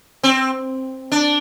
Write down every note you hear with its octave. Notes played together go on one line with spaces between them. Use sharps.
C4
D4